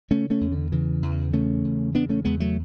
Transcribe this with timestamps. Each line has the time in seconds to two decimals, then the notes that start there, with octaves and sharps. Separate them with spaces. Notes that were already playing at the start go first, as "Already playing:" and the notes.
0.10 C#3 A3 C#4
0.30 A3 C#4
0.41 E2
0.52 D3
0.72 C#3 E3
1.02 E2
1.33 C#3 A3 C#4
1.64 E2
1.94 C#3 B3 D4
2.09 A3 C#4
2.25 E2 G#3 B3
2.40 F#3 A3